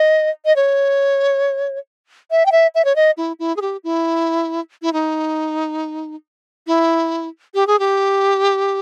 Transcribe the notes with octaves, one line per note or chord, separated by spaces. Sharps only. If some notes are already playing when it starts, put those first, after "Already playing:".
Already playing: D#5
D#5
C#5
E5
G5
E5
E5
C#5
D#5
E4
E4
G#4
G4
E4
E4
D#4
E4
G4
G#4
G4